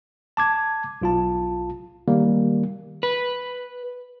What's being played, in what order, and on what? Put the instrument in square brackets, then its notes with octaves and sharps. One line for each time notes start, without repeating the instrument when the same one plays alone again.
[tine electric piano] A5 D6 G#6
B1 F4 A5
D#3 G3 A#3
[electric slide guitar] B4